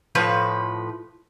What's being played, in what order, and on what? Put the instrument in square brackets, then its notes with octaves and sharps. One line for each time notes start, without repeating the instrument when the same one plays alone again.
[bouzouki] A2 F3 B4